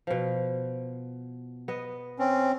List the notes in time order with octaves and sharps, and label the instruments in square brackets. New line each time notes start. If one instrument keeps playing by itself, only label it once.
[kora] B2 F3
B3 D#5
[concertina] C4 C#4